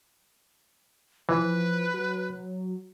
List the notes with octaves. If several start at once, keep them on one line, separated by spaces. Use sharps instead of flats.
E3 F3 B4
F#3